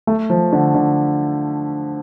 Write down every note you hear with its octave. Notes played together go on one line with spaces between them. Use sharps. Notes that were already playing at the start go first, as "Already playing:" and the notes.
A3
F3
D3
D3